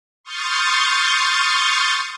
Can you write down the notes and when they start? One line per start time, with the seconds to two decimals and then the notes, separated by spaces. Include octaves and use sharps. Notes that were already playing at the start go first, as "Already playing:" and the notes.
0.23 C6 C#6 D#6 F6 G6 A6